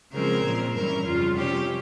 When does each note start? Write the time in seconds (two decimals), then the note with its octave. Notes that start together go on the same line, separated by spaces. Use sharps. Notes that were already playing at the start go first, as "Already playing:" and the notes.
0.13 C#3 F3 G#3 C4 A#4
0.44 A#2 F3 C4
0.75 G2 E3 G3 C#4 A#4
1.05 F2 C#3 G3 F4
1.37 C3 G3 C#4 G4